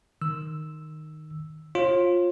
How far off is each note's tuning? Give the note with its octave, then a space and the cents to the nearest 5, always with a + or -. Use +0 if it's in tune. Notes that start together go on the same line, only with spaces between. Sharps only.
D#3 -10 E6 +0
F4 +10 C#5 -45